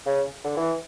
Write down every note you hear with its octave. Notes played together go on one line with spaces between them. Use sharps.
C#3
D3
E3